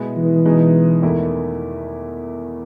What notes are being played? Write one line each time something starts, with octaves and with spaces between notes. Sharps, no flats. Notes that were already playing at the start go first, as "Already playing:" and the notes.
Already playing: B2 G#3 B3 E4
E3
B2 G#3 D#4
E2 D#3 A3 E4